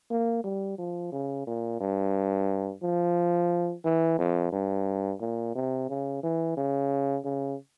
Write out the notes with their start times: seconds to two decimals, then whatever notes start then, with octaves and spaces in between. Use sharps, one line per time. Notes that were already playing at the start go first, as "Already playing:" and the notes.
0.11 A#3
0.44 G3
0.78 F3
1.12 C#3
1.47 A#2
1.81 G2
2.83 F3
3.85 E3
4.19 F2
4.53 G2
5.21 A#2
5.55 C3
5.89 C#3
6.23 E3
6.57 C#3
7.25 C#3